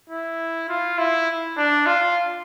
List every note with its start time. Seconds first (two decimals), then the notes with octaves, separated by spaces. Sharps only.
0.09 E4
0.68 F4
0.98 E4
1.57 D4
1.86 F4